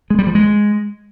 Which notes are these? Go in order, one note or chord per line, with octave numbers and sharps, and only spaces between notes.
G#3
G3
F3
G#3